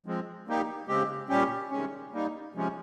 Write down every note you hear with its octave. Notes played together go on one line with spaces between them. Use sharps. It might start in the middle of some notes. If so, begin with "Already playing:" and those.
F3 G#3 C4
G3 A#3 D#4 G4
C#3 G#3 C4 G4
A#2 G3 C#4 G4
C3 D#3 G#3 C#4
G3 A#3 D#4
C3 F3 G#3 C#4